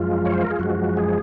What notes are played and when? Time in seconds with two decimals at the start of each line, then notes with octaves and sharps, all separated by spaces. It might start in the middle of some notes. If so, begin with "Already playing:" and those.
Already playing: F#2 F3 G#3 F4
0.25 C#5
0.34 C5
0.43 A#4
0.51 G#4
0.59 F#2 F3 G#3 F#4
0.97 G#4